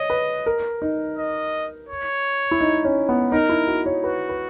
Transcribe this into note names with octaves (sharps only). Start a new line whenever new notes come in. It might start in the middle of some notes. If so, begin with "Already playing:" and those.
Already playing: C#5 D#5
B4
A#4
D#4
D#5
C#5
E4
D#4
C#4
B3
D#4 A#4
E4
F#4
C#5
F#4 B4
B4